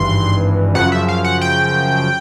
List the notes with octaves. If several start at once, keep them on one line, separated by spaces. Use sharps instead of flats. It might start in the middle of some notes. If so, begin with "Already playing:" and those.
Already playing: G#1 G2 E3 C6
F#2 C#3 F3 F#5
E5
F5
F#5
G5